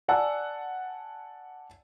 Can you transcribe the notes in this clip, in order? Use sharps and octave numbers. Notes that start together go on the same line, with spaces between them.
D5 F#5 G#5 A5 E6